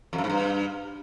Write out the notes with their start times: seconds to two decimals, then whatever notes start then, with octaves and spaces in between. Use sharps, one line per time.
0.13 F2
0.18 F#2
0.24 G#2
0.30 G2